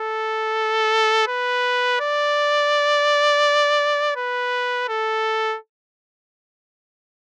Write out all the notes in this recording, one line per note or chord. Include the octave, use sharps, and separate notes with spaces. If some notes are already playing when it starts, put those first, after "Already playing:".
Already playing: A4
B4
D5
B4
A4